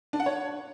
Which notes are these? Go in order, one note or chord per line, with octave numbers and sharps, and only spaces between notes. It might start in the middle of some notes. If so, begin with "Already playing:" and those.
D4
F#5
C#5